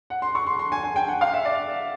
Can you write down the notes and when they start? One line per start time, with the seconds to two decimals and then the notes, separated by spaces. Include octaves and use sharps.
0.10 F#5
0.22 C6
0.35 C#6
0.47 C6
0.59 C6
0.72 G#5
0.83 G#5
0.96 G5
1.08 F#5
1.21 F5
1.33 E5
1.45 D5